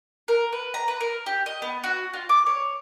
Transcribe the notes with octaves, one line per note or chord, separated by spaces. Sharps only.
A#4
B4
A#5
B4
A#4
G4
D#5
B3
F#4
F4
D6
C#5